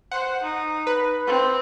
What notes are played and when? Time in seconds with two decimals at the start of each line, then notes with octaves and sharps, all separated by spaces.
0.12 C5 F#5
0.43 D#4
0.87 B4
1.27 C4